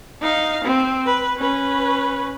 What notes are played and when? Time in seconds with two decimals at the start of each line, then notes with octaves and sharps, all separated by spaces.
0.22 D#4 F5
0.64 C4
1.06 B4
1.37 C#4 B4